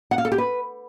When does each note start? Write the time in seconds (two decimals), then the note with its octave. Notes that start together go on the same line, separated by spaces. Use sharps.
0.11 F#5
0.18 F5
0.25 A4
0.32 G4
0.38 B4